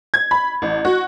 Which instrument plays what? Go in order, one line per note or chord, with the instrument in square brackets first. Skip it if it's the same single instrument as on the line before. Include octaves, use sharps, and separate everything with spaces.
[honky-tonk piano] G#6
B5
A1
F#4